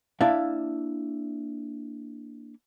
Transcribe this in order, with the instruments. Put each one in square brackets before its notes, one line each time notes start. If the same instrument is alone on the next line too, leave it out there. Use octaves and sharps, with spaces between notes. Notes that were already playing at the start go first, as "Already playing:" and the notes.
[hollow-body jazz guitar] A#3 D4 E4 D5 E5 F5